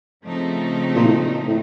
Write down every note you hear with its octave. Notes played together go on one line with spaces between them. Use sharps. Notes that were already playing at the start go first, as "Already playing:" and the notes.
C#3 F3 A3 C4 D#4
A#2
A2
A2